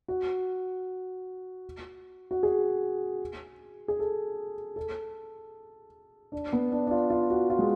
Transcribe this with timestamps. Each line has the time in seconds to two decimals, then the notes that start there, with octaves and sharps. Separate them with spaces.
0.08 F#4
2.31 F#4
2.43 G#4
3.88 G#4
3.99 A4
4.76 A4
6.32 D4
6.53 B3
6.72 D4
6.87 D4
6.91 F4
7.10 F4
7.30 F#4
7.50 F4
7.59 G#3